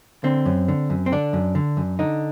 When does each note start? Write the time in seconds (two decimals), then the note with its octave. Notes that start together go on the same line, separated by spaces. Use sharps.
0.24 D3 C4
0.45 F#2
0.68 D3
0.90 F#2
1.06 C4
1.12 D3 D4
1.33 F#2
1.55 D3
1.77 F#2
1.99 D3 D#4